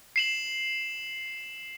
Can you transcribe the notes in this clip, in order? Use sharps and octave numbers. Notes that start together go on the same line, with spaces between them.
C7 E7 F#7